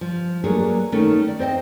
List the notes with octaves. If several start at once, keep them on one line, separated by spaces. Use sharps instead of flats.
F3
F#3 A3 A#3 D4 G#4
D#3 A3 A#3 C#4
D5
C4 C5 D#5 G5